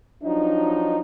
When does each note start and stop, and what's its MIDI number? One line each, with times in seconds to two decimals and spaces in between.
0.23 1.00 53
0.23 1.00 54
0.23 1.00 62
0.23 1.00 63